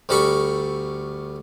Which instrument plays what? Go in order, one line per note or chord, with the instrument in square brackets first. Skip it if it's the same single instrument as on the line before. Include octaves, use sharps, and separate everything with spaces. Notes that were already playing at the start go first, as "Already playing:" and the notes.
[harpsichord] D2 G3 A4 A#4 B5 C#6